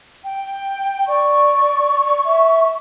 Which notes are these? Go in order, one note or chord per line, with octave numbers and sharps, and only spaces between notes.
G5
D5 C#6
E5